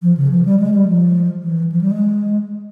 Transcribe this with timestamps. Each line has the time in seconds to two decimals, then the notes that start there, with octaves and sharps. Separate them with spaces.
0.02 F3
0.17 C#3
0.32 F3
0.45 G3
0.60 G#3
0.74 G3
0.88 F3
1.43 E3
1.72 F3
1.81 G3
1.91 G#3